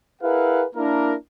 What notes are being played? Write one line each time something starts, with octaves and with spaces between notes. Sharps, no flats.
E4 G#4 A#4 B4 F5 F#5
A#3 D4 E4 A#4